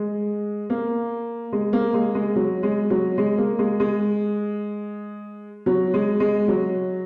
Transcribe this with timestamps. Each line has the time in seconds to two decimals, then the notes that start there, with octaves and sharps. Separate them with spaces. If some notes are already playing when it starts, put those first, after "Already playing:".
Already playing: G#3
0.70 A#3
1.52 G#3
1.73 A#3
1.94 G#3
2.15 G#3
2.36 F#3
2.63 G#3
2.90 F#3
3.18 G#3
3.38 A#3
3.59 G#3
3.80 G#3
5.66 F#3
5.94 G#3
6.20 G#3
6.48 F#3